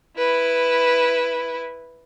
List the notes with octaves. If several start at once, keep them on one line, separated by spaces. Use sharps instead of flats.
E4 B4